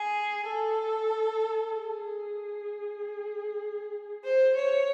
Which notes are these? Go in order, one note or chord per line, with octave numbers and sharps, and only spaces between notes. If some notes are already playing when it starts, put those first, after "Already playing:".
Already playing: G#4
A4
G#4
C5
C#5